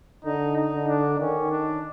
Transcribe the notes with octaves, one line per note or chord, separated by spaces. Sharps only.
D3 D#4
D#4
D3
D4
D#3 C#4
D4